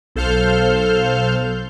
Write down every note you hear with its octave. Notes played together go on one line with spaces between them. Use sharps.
B1 A4 C5 F5 F6 G6